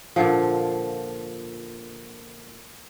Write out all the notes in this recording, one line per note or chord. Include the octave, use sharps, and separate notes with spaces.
A#2 D3 F3